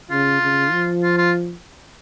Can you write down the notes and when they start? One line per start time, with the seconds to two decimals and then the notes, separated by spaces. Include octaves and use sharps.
0.10 C#3 F4
0.41 C#3
0.72 F3
1.03 F4
1.18 F4